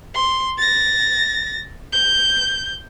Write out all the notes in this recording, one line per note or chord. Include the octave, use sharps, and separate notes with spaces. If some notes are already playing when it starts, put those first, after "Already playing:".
C6
A6 A#6
G6